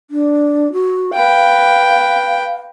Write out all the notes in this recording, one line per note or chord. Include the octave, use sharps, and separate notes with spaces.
D4
F#4
B4 F5 G5